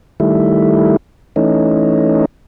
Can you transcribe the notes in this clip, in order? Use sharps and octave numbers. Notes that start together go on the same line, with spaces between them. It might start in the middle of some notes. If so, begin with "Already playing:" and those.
D#3 G3 A3 E4
E3 A3 C#4 D#4